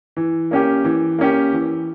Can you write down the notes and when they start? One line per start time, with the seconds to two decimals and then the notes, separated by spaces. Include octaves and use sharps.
0.17 E3
0.51 A#3 C#4 G4
0.84 E3
1.19 A#3 C#4 G4
1.53 E3